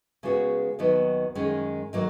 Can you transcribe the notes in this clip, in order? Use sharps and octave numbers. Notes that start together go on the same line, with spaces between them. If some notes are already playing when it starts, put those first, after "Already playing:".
C#3 G#3 B3 F#4
D#2 D#3 F#3 B3 D#4
F#2 D#3 G#3 C#4
D#3 F#3 A#3